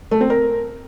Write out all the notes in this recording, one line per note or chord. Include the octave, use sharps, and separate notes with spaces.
A3
C4
A#4